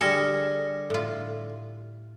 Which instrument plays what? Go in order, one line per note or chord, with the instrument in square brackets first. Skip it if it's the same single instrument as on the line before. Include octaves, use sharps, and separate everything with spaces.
[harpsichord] D3 G3 G#4 [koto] A4 [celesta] F6 A#6 C#7
[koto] A2 F4 [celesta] A4